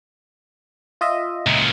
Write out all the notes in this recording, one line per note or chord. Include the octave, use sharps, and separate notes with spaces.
F4 D#5 E5
C#2 A#2